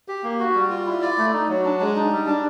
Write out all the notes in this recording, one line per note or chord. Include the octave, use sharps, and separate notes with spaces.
G4
A#3
F#4
G3
F4
E4
D5
A3
D#4
F#3
D4
G#3
D#4
G3
D4